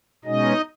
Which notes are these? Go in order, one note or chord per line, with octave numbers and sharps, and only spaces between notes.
B2 G#3 C#4 D#4 D#5